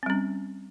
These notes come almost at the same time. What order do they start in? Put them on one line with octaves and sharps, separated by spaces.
C4 G3 C#4